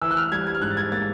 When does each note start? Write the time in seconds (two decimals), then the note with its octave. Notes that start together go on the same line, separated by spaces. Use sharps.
0.02 E3 E6
0.11 F#6
0.17 F6
0.32 G3 G#6
0.47 G#6
0.55 F6
0.61 G#2 F#6
0.71 A6
0.77 G#6
0.92 A#3 A6